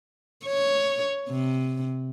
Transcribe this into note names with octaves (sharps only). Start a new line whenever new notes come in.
C#5
C3